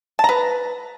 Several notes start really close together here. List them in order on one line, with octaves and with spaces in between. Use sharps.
A5 A#5 B4